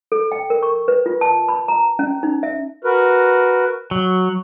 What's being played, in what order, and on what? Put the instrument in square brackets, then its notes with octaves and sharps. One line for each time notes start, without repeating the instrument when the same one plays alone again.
[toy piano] A4
G5
A#4
C#6
B4
F4
A5
B5
A#5
C#4
D#4
E5
[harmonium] F#4 A#4 B4
[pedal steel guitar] F#3